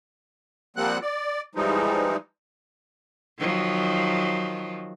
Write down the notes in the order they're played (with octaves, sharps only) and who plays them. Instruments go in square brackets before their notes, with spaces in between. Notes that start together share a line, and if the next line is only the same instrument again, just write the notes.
[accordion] F3 G3 A#3 C4 F#5 F#6
D5
E3 F3 G3 G#3 D#4
[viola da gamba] D#3 F3 F#3